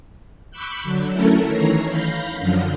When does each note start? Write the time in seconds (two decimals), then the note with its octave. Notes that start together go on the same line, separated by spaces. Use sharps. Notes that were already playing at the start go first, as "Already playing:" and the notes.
0.51 B5 C#6 D6 E6 F#6 G6
0.83 D3 F#3
1.12 F#3 A3 C#4 E4 A4 A#4
1.48 D#3 E3 C#5 A#5 C7
1.89 F5 B5 G6 A#6
2.39 F#2 D3 F3 F#3